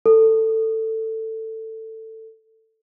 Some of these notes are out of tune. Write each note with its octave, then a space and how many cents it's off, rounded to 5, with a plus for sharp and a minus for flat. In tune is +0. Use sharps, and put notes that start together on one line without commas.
A4 +15